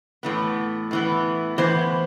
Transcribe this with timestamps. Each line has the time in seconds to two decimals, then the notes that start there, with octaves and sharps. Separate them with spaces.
0.23 A2 E3 B3
0.91 A2 E3 B3
1.58 A2 E3 B3 C5